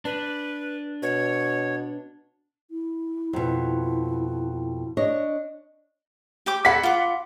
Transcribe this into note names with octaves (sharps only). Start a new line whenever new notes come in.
D4 B4
B2 C#5
E4
F2 B2
D4 C#5 D#5
G4 G5 D6
G#4 A4 F#5 B5 B6
F4 D6